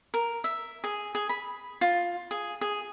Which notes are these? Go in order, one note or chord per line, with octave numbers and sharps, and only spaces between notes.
A#4
E5
G#4
G#4
B5
F4
G#4
G#4